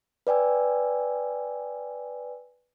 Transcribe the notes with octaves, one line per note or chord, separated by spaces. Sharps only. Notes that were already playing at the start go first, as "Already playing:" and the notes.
B4 D5 G5 G#5 E6